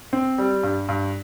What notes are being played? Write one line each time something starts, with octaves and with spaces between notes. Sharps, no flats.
C4
G3
G2
G2